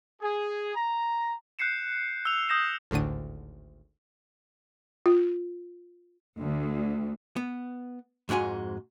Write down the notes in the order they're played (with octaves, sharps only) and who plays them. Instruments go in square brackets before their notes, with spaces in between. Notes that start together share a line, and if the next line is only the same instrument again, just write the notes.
[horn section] G#4
A#5
[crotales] F#6 G6 C7 C#7 E7
E6 F7
D#6 G6 A#6 E7
[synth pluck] G#1 D2 A2 D3 D#7
[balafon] F4
[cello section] D2
[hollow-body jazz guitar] B3
F2 G#2 G#3 F#4 G#5